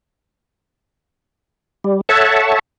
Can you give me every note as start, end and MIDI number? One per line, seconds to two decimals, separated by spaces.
1.84 2.01 55
2.09 2.59 69
2.09 2.59 73
2.09 2.59 76
2.09 2.59 78
2.09 2.59 81